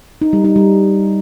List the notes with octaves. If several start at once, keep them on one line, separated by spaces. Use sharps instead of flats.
D#4
G3
D#4
G3